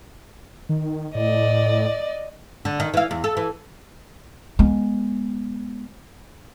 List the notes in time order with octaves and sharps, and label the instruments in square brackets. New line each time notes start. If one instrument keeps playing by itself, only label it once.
[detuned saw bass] D#3
[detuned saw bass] A2 [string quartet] D5 D#5
[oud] D3
D#3
E3 F5
E2
A4
E3
[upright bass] G#3 B3